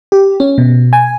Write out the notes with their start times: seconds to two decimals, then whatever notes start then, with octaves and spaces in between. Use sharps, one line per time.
0.12 G4
0.40 C#4
0.58 B2
0.93 G#5